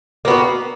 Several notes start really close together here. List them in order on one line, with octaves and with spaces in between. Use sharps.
A#3 B3 F#4